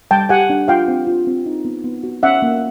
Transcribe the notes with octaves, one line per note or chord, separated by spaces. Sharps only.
G3 G5 A5
G4 F#5 G#5
D4
F4 F5 G5
C4
F4
C4
D#4
B3
B3
F#4
C#4 E5 F#5
A#3